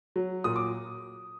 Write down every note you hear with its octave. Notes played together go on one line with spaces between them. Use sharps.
F#3
A#2 D#6
D6